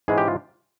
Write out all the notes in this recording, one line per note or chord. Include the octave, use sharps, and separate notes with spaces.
G#2 E3 G#3 C#4 G#4
G4
F4